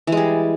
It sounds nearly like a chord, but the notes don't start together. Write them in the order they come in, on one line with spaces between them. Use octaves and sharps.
E3 G#3 G3